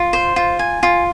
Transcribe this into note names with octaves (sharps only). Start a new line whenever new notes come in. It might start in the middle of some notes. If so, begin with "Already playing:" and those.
Already playing: F4
C5
F4
G#5
F4